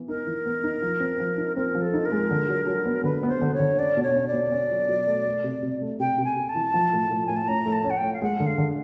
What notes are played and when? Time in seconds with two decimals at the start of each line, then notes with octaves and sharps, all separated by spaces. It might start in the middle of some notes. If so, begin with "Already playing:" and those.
Already playing: E3 B3
0.08 D#4 A#4
0.27 E3
0.46 B3
0.64 D#4
0.82 F3
1.00 C4
1.20 F3
1.38 D#4
1.57 C4 A#4
1.75 F3
1.81 A4
1.94 D#4
2.05 A#4
2.12 G#3
2.31 D3
2.48 F#3
2.67 F#3
2.86 B3
3.04 D3 B4
3.23 B3
3.28 C5
3.41 D3
3.54 C#5
3.60 D3
3.78 C#4 D5
3.97 B2
4.03 C#5
4.15 C#4
4.27 D5
4.33 B2
4.52 C#4
4.71 F#3
4.89 F#3
5.07 A3
5.26 A3
5.44 C3
5.63 C3
5.81 A3
6.00 C3 G5
6.18 C3
6.24 G#5
6.36 C3
6.49 A5
6.55 E3
6.74 F3
6.93 A2
7.11 A2
7.26 A2 G#5
7.36 A5
7.48 C#4 A#5
7.66 A3
7.72 A5
7.84 C#4
7.90 F#5
7.97 G5
8.04 A3
8.13 F5
8.22 G#3 F#5
8.40 D3
8.46 F5
8.58 D3